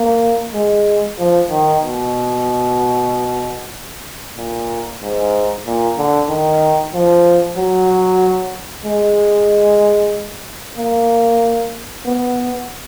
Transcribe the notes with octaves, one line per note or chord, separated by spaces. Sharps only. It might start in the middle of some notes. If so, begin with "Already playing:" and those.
Already playing: A#3
G#3
F3
D#3
B2
A#2
G#2
A#2
D3
D#3
F3
F#3
G#3
A#3
B3